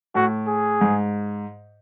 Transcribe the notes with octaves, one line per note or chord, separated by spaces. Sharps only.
A2 F#4
G#4
G#2